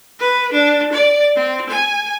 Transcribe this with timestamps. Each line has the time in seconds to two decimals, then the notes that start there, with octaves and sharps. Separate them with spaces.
0.19 B4
0.52 D4
0.92 D5
1.36 C4
1.69 G#5